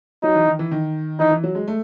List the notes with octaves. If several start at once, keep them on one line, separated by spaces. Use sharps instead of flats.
F#3 D#4
E3
D#3
E3
D#3
E3 D#4
E3
F#3
G#3
A3